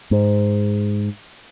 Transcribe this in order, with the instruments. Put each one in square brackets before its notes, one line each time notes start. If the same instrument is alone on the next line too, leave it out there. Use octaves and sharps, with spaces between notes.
[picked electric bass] G#2